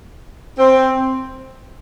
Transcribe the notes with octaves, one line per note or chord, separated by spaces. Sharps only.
C4